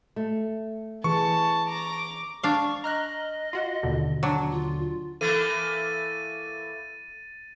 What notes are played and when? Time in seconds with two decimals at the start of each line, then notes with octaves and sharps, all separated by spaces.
0.16 A3
1.04 E3 G#4 A5 C#6
1.68 A#5 D6
2.43 D4 F5 C#6
2.84 D#5 A#5 F6 F#6
3.53 F4 F#4 F#5
3.83 D#2 B2 D3
4.23 F#3 D4
4.51 F4
5.21 E3 A3 A#3 A4 A6 D#7